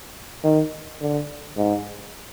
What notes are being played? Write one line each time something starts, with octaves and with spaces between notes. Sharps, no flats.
D#3
D3
G#2